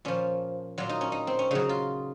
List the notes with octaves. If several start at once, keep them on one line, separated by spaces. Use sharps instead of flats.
A#2 F3 C#4
A#2 F#3 F4
D#4
C#4
D#4
C4
C#4
C#3 F#3 D#4
F4